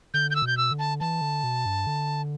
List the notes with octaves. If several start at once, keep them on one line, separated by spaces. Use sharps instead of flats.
D3 G6
G6
E6
B2 G6
E6
D3
A5
E3 A5
D3
B2
G2
D3